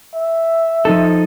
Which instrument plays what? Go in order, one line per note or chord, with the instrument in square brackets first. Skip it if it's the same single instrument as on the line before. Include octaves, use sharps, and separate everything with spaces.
[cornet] E5
[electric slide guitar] F3 D#4 A4